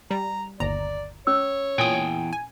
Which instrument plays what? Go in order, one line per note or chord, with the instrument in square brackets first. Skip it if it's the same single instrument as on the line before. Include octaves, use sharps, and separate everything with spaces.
[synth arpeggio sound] G3 [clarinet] A#5
[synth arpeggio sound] G1 D#2 A#5 [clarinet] D5
[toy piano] C#4 E6 [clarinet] C#5
[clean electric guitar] E2 G5 G#5 [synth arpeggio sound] A#2 D#6
[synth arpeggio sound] G#5